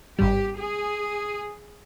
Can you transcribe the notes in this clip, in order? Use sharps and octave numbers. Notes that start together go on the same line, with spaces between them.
G#1 G2 G3 G4
G#4